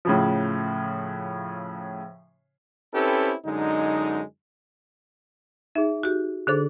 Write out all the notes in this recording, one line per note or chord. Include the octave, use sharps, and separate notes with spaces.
A2 C#3 F3
C4 C#4 E4 G4 A4 B4
F#2 D3 G#3 D#4
D#4 G#4 E5
F#4 G4
D3 D4 G#4 A4 C5